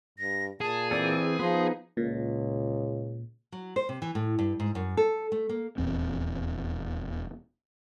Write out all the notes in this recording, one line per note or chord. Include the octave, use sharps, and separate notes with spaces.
G2 A#6
A#2 G#4 A5
E3 C4 A4 D5
F3 B3 D#4 C6
C#2 A#2
F#3
C5
C3
E3
A2
G2
G#2
F#2
A4
A3
A#3
D#1 E2 C4